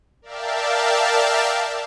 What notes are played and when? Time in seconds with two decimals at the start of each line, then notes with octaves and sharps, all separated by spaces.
0.22 A#4 D5 E5 F5 G5 A5